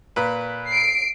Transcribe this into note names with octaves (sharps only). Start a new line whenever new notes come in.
A#2 B4
C7 D7